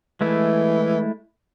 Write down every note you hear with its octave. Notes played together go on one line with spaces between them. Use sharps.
E3 G#3 A3 E4